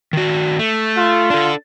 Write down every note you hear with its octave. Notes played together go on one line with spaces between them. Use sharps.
D#3 F#4
A3
F4
D4 A4